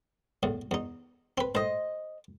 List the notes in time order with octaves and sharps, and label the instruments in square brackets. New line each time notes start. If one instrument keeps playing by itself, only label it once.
[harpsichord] E2 A2
E2 D#4
C4 B4
[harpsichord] A2 [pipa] C5 D#5